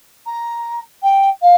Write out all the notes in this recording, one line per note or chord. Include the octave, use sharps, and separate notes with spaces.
A#5
G5
F5